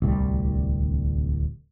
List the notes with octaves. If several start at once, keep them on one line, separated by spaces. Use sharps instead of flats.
D1 C2 G3